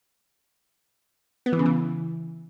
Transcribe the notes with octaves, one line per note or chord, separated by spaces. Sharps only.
B3
E3
C#3
E3